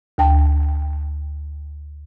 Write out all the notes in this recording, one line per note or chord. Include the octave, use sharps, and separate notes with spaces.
D2 G5 A5